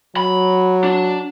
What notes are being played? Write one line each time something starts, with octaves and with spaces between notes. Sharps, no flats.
F#3 B5
D4